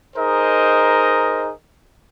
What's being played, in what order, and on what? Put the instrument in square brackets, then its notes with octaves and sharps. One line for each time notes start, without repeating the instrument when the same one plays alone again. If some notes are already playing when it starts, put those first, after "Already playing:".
[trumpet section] D#4 G#4 A#4 C5 D#5